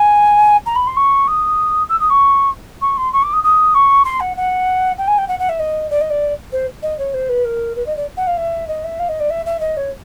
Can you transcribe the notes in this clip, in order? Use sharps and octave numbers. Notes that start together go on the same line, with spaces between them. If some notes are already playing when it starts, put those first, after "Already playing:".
Already playing: G#5
A#5
B5
C6
C#6
D#6
E6
D#6
C#6
C#6
C6
C#6
D6
D#6
D#6
C#6
C6
F#5
F#5
G5
G#5
G5
F#5
F#5
E5
D#5
D5
D#5
D5
C5
D#5
C#5
C5
B4
A#4
B4
D#5
D5
F#5
F5
E5
D#5
E5
F5
D#5
D5
E5
E5
D#5
C#5